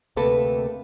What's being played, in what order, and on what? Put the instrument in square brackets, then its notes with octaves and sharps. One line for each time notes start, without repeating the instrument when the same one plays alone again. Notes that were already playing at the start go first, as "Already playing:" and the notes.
[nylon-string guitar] D2 C3 A3 A#3 A4 B4